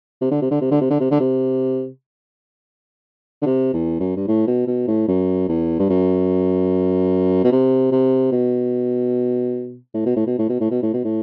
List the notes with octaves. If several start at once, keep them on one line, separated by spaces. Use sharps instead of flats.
C3
D3
C3
D3
C3
D3
C3
D3
C3
D3
C3
D3
C3
E2
F#2
G2
A2
B2
B2
A2
F#2
E2
G2
F#2
B2
C3
C3
B2
A2
B2
A2
B2
A2
B2
A2
B2
A2
B2
A2